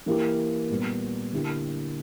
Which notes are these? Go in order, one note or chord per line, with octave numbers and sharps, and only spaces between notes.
E3 A#3 E4 G4
A#2 G3 B3
D3 A#3 E4 G4